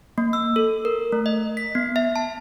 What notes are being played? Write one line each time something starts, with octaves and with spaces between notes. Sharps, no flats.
A#3
E6
A4
A#4
A3
D#5
B6
B3
E5
A5